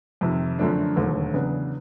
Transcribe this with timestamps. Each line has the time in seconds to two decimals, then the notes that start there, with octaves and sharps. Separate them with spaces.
0.21 F2 C3 D#3
0.59 F#2 D3 F3 A3 D4
0.96 E1 D#2 D3 F#3 A3
1.34 E2 C#3 F#3 B3 D4